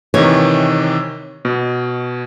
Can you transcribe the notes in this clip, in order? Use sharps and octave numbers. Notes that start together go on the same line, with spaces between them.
C3 D#3 E3 C#5
B2